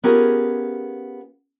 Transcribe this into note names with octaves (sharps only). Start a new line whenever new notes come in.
B3 C#4 F4 G4 G#4 A#4